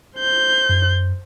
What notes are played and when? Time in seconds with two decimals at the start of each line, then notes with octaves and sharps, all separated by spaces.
0.17 C5 G6
0.69 F#2